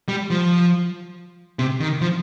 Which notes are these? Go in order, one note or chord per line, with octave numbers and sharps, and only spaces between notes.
G3
F3
C3
D#3
F3